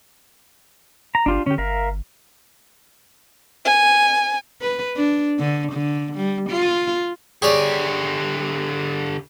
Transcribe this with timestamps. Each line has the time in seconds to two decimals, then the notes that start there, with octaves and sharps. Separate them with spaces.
1.15 A#5
1.26 G1 D4 F4 G4
1.46 D3 C#4 G4
1.58 G1 A#4 E5 F5
3.65 G#5
4.61 B4
4.96 D4
5.39 D3
5.72 D3
6.16 G3
6.49 F4
7.42 D3 G4 G#4 C#5 D5